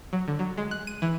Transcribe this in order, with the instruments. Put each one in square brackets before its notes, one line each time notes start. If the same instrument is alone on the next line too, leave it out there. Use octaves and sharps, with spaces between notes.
[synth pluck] F#3
D3
F#3
G#3
F#6
D#7
E3